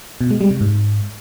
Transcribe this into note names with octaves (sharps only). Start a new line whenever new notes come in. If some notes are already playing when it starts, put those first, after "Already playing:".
B2
G#3
G3
C3
G#2